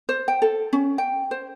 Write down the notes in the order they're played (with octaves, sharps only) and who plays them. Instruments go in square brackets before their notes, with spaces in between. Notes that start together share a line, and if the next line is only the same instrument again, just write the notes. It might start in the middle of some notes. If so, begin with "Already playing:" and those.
[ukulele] C5
G5
A4
C#4
G5
C5